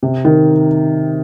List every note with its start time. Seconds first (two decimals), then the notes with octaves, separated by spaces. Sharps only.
0.03 C3
0.25 D#3